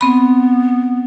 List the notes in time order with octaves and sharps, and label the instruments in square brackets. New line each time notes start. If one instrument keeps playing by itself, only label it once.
[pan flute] B3 [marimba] C4 B5